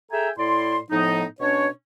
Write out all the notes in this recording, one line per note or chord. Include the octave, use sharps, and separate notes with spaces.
G#4 A4 E5 G5 G#5 A#5
A2 E4 D5 C6
A2 F3 B3 D#4
B2 C#4 D4 C#5